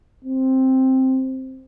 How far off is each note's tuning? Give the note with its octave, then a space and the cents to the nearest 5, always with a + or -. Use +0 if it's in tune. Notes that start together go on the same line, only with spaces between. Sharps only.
C4 +5